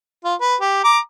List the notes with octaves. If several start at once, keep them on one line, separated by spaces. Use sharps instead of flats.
F4
B4
G4
A#5 D6